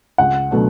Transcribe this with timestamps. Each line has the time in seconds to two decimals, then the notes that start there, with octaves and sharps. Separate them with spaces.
0.18 C#2 F#5
0.51 B2 F#3 A3 D4